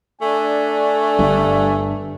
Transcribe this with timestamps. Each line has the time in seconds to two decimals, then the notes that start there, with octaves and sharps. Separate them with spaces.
0.21 A3 D4 G#5
1.19 G1 G2